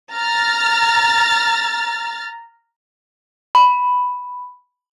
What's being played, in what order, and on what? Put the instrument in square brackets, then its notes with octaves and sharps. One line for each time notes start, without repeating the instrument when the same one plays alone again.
[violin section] A#5 F6 A6
[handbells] B5